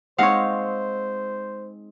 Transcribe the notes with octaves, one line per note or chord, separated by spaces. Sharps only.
G#3 C4 D#4 C5 C#5 F5 F#5